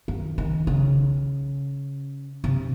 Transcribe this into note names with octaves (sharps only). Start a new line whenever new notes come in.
D#3
D#3
C#3
C3